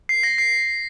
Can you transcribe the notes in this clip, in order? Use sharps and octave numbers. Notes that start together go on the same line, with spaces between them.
C7
A#6
C7